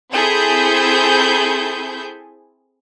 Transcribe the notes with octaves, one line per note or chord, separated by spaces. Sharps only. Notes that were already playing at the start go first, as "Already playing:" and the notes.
C4 E4 G#4 A4 G#5 G6